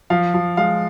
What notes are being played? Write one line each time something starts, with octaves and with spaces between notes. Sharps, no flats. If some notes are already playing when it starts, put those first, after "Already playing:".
F3 F5
F3
G#3 F5